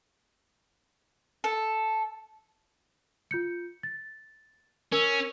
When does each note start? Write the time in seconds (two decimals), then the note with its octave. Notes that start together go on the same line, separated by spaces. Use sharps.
1.44 A4
3.31 F4 G6 C#7
3.83 A6
4.92 C#4 A#4 E6